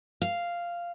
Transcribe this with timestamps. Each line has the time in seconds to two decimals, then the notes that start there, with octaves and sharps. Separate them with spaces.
0.22 F5